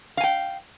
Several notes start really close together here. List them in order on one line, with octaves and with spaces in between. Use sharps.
F5 G#5 G5